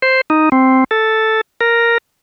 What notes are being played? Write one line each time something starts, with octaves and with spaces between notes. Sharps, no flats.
C5
D#4
C4
A4
A#4